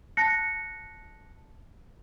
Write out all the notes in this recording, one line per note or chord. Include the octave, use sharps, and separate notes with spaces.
A5 F#6 A#6 C#7